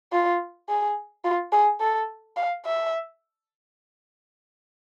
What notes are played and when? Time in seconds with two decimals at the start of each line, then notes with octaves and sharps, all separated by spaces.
0.12 F4
0.69 G#4
1.24 F4
1.52 G#4
1.81 A4
2.37 F5
2.65 E5